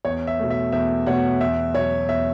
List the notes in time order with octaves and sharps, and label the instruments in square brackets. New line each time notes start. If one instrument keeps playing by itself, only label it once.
[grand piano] E2 C#5
E5
B2 A3
E5
E2 E5
B2 A3 C#5 F#5
E2 E5
B2 F#3 C#5
E2 E5